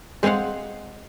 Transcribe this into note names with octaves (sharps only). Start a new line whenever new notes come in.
G#3 C4 G#4 F5 F#5